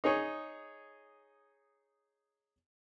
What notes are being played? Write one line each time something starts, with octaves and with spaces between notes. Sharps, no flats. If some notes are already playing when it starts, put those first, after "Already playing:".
D#4 G#4 C#5